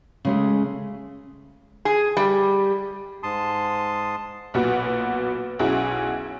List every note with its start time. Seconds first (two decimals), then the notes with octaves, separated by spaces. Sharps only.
0.25 C#3 G#3 A3
1.85 G#4
2.17 G3
3.23 G#2 A5 C6 D#6
4.54 B1 A#2 B3 F#4 B4
5.59 B1 C#4 E4 F#4 G#4